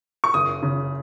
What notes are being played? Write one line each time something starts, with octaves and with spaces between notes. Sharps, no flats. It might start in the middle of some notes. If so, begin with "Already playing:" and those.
C#6
F#1 D#6
C#3